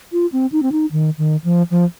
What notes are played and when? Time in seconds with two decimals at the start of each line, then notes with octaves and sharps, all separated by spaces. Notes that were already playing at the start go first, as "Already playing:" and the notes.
0.12 F4
0.32 C4
0.52 D#4
0.63 C4
0.72 D#4
0.92 D#3
1.18 D#3
1.44 F3
1.71 F3